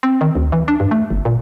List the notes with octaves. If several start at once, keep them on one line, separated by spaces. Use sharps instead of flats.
C4
D#3
D2
E3
D4
G2
A3
G1
A#2